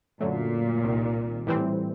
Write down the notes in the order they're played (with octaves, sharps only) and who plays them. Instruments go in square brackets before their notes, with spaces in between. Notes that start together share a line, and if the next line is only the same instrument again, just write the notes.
[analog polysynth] F#2 D3 F#3 A3 [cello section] A#2
[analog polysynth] C2 C3 D#3
A2 E3 G3 C4